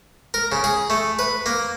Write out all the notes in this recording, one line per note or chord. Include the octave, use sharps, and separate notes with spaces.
A#4
C#3
G#4
A3
B4
A#3